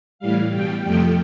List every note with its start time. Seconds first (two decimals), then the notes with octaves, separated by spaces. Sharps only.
0.19 A2 E3 G3 F5
0.52 B2 G3 G5
0.83 F2 C3 F3 A3 G5